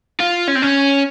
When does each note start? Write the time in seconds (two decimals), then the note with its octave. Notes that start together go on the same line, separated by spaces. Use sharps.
0.20 F4
0.48 C#4
0.55 C4
0.62 C#4